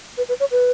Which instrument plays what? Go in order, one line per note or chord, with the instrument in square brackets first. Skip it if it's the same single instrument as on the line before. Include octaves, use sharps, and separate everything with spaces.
[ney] B4
B4
C#5
B4